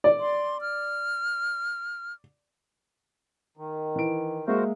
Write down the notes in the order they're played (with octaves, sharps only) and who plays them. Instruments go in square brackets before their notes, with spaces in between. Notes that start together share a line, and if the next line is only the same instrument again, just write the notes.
[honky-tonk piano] D5
[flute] C6
F6
[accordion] D#3
[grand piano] E3 D7
[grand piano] G#3 A#3 E5 [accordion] F#4 A#4 C5